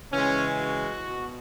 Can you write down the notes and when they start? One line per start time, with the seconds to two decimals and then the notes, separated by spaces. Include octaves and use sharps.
0.12 C#3 E3 G#3 C#4
0.60 F#4
1.09 B2